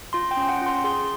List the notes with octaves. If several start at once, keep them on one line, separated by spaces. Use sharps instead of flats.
F4 C6
G5
C#4
F#5
F4 C6
G#4 C6